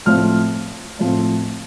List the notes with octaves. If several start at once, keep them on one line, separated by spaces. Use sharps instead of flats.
A2 F3 C4 F6
A2 F3 C4